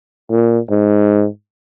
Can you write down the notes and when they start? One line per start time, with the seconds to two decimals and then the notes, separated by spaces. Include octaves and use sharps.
0.31 A#2
0.70 G#2